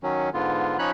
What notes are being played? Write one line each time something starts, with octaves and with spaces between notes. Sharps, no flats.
D#3 F#3 C#4
G#2 D3 B3 F4
F3 C#4 D#4 C#5 B5 F#6